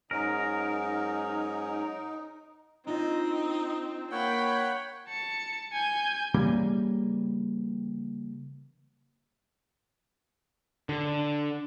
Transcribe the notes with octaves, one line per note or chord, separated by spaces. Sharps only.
G#2 F#3 C#4 D#4 A#4
C4 D4 D#4 F4 D#5
A#3 C#5 F#5 G5 B5
A5 C#7
G#5 G6
C#3 E3 G3 A#3
D3